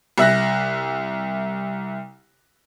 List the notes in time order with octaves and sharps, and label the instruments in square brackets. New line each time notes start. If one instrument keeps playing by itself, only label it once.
[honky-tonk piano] C2 E5 F#6 A#6